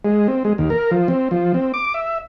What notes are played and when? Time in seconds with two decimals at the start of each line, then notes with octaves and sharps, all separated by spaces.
0.05 G#3
0.28 C4
0.45 G#3
0.58 D#2
0.70 A#4
0.91 F3
1.08 C4
1.31 F3
1.54 C4
1.74 D6
1.94 E5